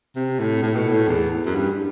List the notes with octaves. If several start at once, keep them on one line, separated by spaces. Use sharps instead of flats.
C3
A2
A2
B2
A2
E2
F#2
G2